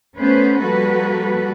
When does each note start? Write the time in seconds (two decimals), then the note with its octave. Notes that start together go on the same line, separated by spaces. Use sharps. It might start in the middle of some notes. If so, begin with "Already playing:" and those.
0.17 A3 B3 C#4 B4 C5
0.60 F3 G3 A#3 F#4 A4 B4